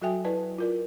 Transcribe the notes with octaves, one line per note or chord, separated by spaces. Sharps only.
F#3 F#4 A4 E5 G5 G#5
E4 B4 D5 D#5 A5
F4 A#4 D5